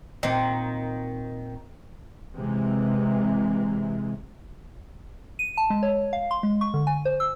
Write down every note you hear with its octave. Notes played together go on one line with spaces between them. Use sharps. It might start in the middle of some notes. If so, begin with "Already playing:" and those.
A#2 D#3 C4
C3 E3 G#3
D#7
A5
G#3
C#5
F5
C6
G#3
C#6
D3
G#5
C5
E6